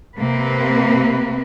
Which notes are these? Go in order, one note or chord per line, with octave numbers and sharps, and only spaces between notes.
C3 A#3 C4 B4